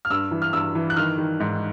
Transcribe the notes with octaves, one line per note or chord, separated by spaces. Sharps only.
F6
G2 E6
E3
F6
G2 E6
E3
F#6
D#3 F6
D#3
G#2